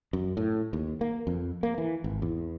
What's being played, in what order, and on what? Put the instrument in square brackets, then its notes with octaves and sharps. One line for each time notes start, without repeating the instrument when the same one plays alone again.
[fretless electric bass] F#2
A2
D#2
A#3
F2
A#3
E3
G#1
E2